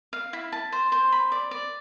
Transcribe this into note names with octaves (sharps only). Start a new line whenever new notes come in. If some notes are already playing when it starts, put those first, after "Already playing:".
F5
E4
A5
C5
C5
B5
D5
D5